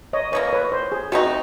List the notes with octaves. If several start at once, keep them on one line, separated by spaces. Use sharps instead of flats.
C#5 D#5
B2 F#3 A#3 C#5 D#5
B4 C#5
C5
G#4
A3 C4 D#4 F#4